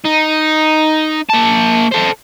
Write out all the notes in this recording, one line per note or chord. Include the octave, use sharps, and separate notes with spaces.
D#4
A#3 A5
A4 C5